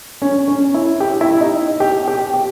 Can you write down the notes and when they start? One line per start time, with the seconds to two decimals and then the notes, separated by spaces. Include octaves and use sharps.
0.22 C#4
0.48 C#4
0.74 E4
1.00 G4
1.21 E4
1.41 D#4
1.80 G4
2.08 G4
2.34 G4